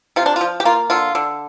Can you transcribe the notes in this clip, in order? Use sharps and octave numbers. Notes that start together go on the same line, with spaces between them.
C3 F4
D4
F4
F3
G4
A#3 F4
D3 F4
D3